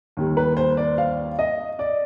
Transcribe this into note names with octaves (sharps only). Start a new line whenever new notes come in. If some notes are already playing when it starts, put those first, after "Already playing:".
D#2 D#3 G3
B4
C5
D5
F5
D#5
D5